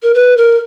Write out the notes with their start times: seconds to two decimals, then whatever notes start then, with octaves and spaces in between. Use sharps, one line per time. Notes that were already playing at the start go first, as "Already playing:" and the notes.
0.03 A#4
0.14 B4
0.38 A#4